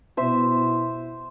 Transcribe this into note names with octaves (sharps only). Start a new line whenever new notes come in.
B2 B3 E4 C5 E5